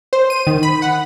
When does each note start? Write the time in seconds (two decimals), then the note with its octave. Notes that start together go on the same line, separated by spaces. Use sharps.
0.13 C5
0.30 D#7
0.47 D#3
0.63 B5
0.82 F#5